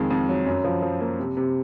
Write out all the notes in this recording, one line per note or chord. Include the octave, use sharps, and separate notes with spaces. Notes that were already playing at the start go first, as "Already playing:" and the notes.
Already playing: F2 D#3 G#3
F2
F#3
F#2
F3
F3
A#3
C3
C3